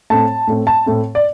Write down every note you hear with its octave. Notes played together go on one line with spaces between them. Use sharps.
A2 A3 C4 A5
A2 A3 C4
A5
A2 A3 C4
D5